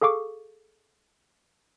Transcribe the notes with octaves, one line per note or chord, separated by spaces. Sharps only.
G#4 A4 F5 C#6 D6